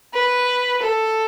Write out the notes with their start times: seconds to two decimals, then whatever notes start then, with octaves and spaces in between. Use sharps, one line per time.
0.13 B4
0.82 A4